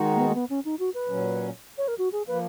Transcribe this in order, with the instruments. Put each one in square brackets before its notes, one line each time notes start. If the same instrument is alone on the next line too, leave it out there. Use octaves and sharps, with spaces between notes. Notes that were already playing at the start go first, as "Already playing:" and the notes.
Already playing: [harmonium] D#3 G#3 D#4 F#4
[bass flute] A#3
B3
A#3
B3
C#4
D#4
F#4
B4
[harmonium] A#2 F#3 C#4
[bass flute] C#5
A#4
F#4
G#4
[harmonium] F3 A#3 [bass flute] B4